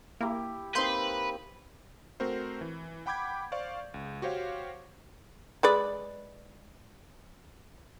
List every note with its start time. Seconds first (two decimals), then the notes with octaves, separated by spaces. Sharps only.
0.21 A#3 E4 G4
0.75 A#3 C4 D#4 B4 C6 G6
2.20 A3 C4 F#4 A#4 C5
2.61 E3
3.06 F#5 G5 B5 D6 G6 G#6
3.52 C5 D5 F5 C#6
3.94 C#2
4.22 F#4 G4 C5 C#5 F5
5.63 G#3 B4 D5